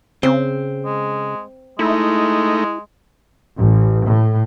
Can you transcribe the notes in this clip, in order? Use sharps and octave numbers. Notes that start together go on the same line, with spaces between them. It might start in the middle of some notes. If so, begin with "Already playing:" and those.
C#3 C4
G#3
G#3 A3 D#4 E4
A1
A2